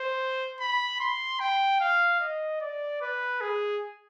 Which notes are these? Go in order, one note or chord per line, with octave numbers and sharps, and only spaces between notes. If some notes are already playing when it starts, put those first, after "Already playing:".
Already playing: C5
B5
C6
G5
F5
D#5
D5
B4
G#4